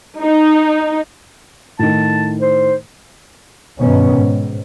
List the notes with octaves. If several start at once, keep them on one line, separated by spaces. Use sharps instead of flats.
D#4
A2 D#3 A5
C5
G2 B2 D#3 B3 C#4
G#2